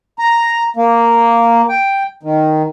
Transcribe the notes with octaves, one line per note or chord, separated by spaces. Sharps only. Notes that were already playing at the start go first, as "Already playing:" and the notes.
A#5
A#3
G5
D#3